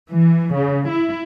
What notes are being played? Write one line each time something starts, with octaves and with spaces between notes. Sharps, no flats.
E3
C#3
E4